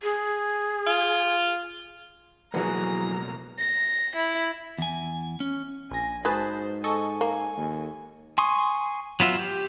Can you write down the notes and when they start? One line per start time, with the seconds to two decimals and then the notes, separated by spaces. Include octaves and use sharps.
0.03 G#4
0.86 F4
2.54 B1 F2 B2 E3 F#3 A#3 G#4 A#5
3.59 A#6
4.16 E4
4.78 E2 G#5
5.40 C#4
5.91 A#1 G#5 A#6
6.25 G#2 F#3 G#4 B4 C5 A5 B5
6.84 A4 D#5 G#5 C#6
7.21 A#3
7.57 D#2
8.38 G#5 C6 C#6 D#6
9.20 F#3 B3 F4 E5
9.39 G4